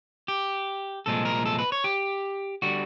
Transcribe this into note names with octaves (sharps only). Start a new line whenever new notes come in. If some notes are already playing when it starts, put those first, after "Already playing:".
G4
C2 A#2 F3 G#3 A4
A#4
A4
B4
C#5
G4
D3 G3 F#4